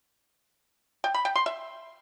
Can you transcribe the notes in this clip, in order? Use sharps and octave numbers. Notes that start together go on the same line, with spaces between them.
G5
B5
G5
C6
E5